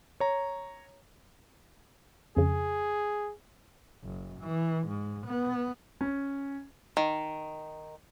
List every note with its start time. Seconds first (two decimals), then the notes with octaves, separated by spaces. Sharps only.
0.20 C#5 A#5
2.37 F2 C#3 G#4
4.04 F#1
4.41 E3
4.87 G#2
5.26 B3
6.01 C#4
6.97 D#3